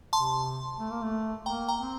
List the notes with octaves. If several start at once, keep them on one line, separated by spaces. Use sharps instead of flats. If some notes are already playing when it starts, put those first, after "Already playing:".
C3 A5 C6
A3
A#3
A3
A#3 G5 A#5
G5 A#5
C4